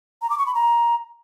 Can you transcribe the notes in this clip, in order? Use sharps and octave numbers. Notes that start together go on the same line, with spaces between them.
A#5
D6
C#6
B5
A#5